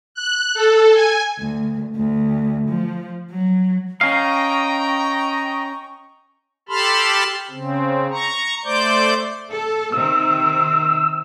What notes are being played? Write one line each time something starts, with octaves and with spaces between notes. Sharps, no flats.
F#6
A4
G#5
D2
D2
F3
F#3
C#4 D#5 F5 G5 A#5 C#6
G4 A4 A5 B5 C6 F6
C#3 C4
A#5 C#6
A3 C5 D5 D6 G6
A4
C3 D#3 C4 E6